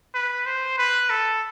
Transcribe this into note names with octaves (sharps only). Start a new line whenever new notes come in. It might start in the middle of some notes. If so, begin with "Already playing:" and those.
B4
C5
B4
A4